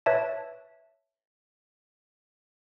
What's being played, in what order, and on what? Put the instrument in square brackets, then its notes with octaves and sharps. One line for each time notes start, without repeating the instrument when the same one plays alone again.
[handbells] B4 C#5 E5 A5